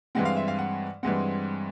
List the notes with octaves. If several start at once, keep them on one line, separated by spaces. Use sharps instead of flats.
G2 E3 G#3 C4 F#5
F5
E5
F5
F#5
G2 E3 G#3 C4 F#5